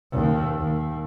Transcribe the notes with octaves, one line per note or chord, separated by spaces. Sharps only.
D#2
D#2